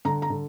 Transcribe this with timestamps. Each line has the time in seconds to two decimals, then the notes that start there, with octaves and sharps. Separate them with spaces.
0.05 D3 A#5
0.22 A#5
0.30 D3